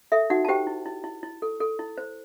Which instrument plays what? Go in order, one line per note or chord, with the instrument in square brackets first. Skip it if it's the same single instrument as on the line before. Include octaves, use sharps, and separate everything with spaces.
[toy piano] A4 E5
D#4 F#4 F#5
A5
G4 C5 G5
E4
E4
E4
E4
A4
A4
E4
C5